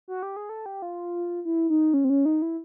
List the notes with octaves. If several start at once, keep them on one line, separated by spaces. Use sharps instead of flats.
F#4
G4
G#4
A4
G4
F4
E4
D#4
C#4
C4
C#4
D#4
E4